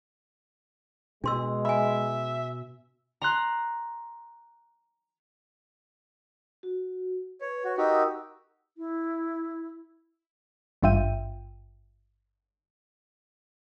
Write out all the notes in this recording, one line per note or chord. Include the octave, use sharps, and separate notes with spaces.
B2 G#3 D4 C6 E6
E5 G#5 B5
A#5 C6 F#6
F#4
B4 C#5
F#4
D#4 F#4 G4 A#4 D#6 E6
E4
G#1 G2 F4 E5 G5 D#7